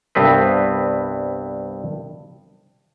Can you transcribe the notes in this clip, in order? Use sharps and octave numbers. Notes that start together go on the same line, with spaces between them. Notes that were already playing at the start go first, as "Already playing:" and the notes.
C2 G2 B3 C4 B4